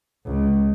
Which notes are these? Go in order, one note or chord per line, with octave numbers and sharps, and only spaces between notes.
C#2